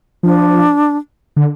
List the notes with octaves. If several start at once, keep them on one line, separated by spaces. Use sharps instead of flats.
F3 D4
D3